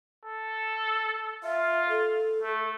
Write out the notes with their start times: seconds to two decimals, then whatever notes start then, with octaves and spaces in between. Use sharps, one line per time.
0.25 A4
1.43 F4 E5
1.89 A4
2.42 A3